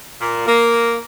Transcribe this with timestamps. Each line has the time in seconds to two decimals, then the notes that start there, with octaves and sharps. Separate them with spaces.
0.20 A#2
0.47 A#3